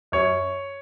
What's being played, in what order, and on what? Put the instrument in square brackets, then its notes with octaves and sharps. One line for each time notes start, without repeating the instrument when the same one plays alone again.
[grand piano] F#2 C#5